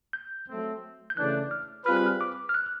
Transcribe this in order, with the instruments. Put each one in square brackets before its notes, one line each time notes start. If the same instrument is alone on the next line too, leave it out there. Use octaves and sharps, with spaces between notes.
[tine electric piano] G6
[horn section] F#3 A3 C4
[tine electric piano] G6
[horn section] C#3 E3 A3 D4 [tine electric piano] F#6
[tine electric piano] F6
[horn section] G3 C4 F4 G#4 B4 [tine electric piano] F6
[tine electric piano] F#6
F6
D6
F6
F#6